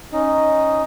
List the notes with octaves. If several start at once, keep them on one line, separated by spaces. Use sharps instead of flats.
C#4 D#4 D#5